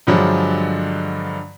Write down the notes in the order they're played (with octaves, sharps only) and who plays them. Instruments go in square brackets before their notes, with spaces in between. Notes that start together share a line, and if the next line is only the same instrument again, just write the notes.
[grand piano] G2 D3 F3 F#3 G#3 D4